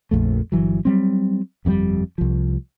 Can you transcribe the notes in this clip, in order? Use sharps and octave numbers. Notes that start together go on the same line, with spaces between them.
A#1 F2 A3
G1 E3 F#3
F#3 G3 C4
G1 F2 C#3 G3
C2 F3